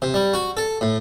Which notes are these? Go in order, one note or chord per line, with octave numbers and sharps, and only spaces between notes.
C3
G3
F#4
A4
A2